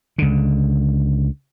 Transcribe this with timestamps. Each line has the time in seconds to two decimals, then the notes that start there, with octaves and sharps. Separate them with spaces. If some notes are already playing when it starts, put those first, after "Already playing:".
0.18 C#2 D3